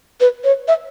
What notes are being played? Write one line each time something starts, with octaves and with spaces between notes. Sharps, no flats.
B4
C#5
E5